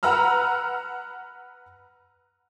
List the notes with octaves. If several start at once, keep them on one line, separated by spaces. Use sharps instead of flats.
B4 F#5 A#5 E6 F6